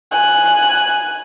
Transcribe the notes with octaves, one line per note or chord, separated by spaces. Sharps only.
G#5 F#6